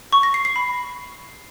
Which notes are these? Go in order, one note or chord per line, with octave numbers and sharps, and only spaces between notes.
C#6
A#6
C7
C7
B5